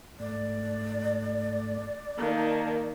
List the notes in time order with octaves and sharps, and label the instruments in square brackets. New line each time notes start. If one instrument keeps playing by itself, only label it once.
[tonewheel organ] G#2 A3 [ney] D5
[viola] D#3 [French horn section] A#3 [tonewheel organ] A5 A#5